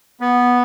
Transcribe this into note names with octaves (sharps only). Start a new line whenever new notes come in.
B3